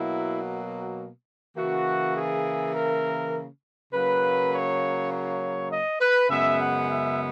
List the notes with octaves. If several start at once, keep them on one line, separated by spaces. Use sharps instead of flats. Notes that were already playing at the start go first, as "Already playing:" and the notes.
Already playing: B2 F#3 A#3 E4
C#3 E3 A#3 F#4
G#4
A#4
C#3 F#3 A#3 B4
C#5
C#5
D#5
B4
F#2 C#3 G#3 B3 E5
F#5
E5